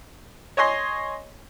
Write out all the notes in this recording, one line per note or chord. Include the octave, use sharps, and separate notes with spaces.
C#5 D#5 G#5 C6